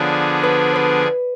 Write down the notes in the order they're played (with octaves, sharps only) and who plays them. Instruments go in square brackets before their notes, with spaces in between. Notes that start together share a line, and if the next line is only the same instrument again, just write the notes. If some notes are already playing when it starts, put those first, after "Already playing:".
Already playing: [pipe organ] D3 F3 B3 D4 G#4 [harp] D5
[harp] B4
B4